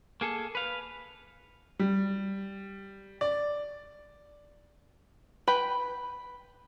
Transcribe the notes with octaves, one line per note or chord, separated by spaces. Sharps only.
A#3 G#4 A4
B4 F5
G3
D5
B4 G5